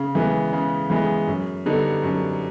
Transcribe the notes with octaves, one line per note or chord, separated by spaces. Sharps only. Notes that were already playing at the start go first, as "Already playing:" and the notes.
Already playing: C#3
E3 G#3 B3
C#3
E3 G#3 B3
F#2
D3 G3 B3 D#4
F#2